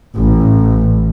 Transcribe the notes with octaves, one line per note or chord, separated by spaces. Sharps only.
A1